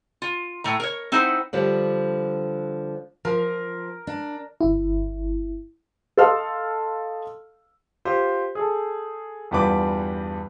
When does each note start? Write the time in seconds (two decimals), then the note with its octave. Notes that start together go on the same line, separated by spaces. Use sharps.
0.22 F4
0.64 A2 A3 A#5
0.80 A#4 C#5
1.12 C4 D#4 E4 C5 F#5
1.53 D3 F3 G3
3.25 F3 A#4
4.07 D4
4.61 G1 E4
6.17 A4 D#5 F5 C6 E6 F6
8.05 F4 G4 C5
8.55 G#4 A4
9.51 E2 G2 G3 F4 B4 D6